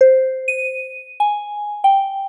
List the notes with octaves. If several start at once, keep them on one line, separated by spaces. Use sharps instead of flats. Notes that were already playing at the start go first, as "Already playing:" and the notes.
C5
D#7
G#5
G5